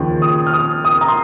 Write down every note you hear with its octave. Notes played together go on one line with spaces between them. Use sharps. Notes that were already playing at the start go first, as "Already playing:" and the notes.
Already playing: D#2 C#3 F3
D#6
F6
D#6
D#6
A#5
C6